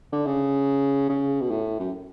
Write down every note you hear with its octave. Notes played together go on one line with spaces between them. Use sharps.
D3
C#3
C#3
B2
A2
F#2